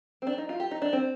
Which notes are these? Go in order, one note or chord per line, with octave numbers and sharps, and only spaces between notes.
C4
D4
D#4
F4
G4
D#4
D4
C4